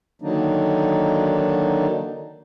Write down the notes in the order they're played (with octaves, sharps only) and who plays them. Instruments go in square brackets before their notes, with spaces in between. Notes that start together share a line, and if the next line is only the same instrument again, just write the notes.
[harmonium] D3 D#3 F#3 A#3 D4 D#4